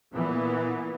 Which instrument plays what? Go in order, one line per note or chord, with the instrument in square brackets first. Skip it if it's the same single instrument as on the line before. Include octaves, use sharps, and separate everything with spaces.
[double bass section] A#2 E3 B3